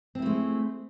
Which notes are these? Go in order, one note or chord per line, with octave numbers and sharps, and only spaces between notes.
G#3 A3 C4 E4